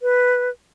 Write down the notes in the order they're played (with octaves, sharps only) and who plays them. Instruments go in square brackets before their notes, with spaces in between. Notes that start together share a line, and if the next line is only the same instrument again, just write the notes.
[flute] B4